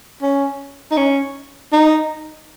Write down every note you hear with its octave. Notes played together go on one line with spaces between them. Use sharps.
C#4
D#4
C#4
D#4